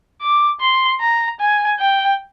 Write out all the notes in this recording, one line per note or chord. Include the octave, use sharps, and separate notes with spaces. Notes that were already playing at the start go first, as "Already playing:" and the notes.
D6
C6
A#5
G#5
G5